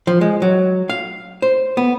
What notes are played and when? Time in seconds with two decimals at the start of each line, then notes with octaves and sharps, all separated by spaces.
0.07 F3
0.21 G#3
0.42 F#3
0.89 F5
1.42 C5
1.77 B3